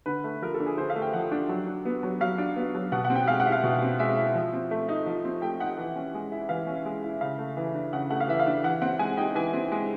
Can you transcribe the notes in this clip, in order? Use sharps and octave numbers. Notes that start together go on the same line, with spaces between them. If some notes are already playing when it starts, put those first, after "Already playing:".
D3 B4
A3
F3 A#4
A4
D4
G#4
D3 C5
F5
A3
G5
F3 F#5
D4
F#3
D4
B3
F#3
F#3 F5
D4
B3
F#3
B2 F#5
F#5
C4
G5
G#3 F5
F#5
E4
F5
B2
C4
G#3 E5
E4
F3
C4
A3
D#4
F3
C4
A3 G5
D#4 F#5
E3
C#4
G#3
E4
E3 F5
C#4
G#3
E4
C#3 F5
A3
E3
D4
C#3 F#5
A3 F#5
F5
E3 E5
F5
D4
E3 F#5
C4 F#5
G#3 G#5
D#4 G5
E3 G#5
C4
G#3